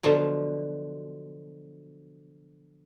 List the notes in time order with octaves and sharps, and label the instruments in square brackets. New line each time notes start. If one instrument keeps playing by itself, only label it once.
[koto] B2 D3 F3 F#3